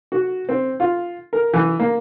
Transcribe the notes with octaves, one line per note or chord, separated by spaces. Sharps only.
F#4
C4
F4
A#4
E3
A#3